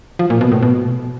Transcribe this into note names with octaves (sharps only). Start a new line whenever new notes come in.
F3
A#2
B2
A2
B2